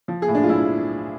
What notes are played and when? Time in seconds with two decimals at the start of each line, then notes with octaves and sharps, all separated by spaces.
0.08 F3
0.22 G#4
0.28 A2
0.35 D4
0.43 F4
0.49 B1 E4